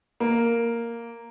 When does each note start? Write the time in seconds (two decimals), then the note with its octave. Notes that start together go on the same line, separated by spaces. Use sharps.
0.20 A#3